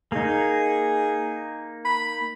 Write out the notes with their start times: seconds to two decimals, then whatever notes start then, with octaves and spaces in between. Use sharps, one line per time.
0.12 A#3 D#4 G#4
1.85 B5